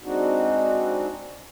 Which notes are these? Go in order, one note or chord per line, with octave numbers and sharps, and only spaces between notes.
G#3 C4 D4 D#4 F#4